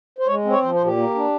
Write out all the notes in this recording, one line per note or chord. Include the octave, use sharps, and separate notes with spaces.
C5
G#3 C#5
C4
C#5
F3 C5
C5
A#2
G4
A#3
D4